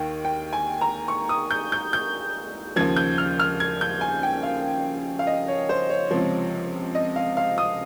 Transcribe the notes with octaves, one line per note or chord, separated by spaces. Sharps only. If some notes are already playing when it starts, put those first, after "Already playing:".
Already playing: D#2 D#3 G5
G5
G#5
A#5
C#6
D#6
G6
G6
G6
D#2 C#3 F3 G#6
G6
F6
F6
G#6
G6
G#5
G5
F5
F5
D#5
C#5
C5
C#5
C#2 C3 F3
D#5
F5
F5
D#6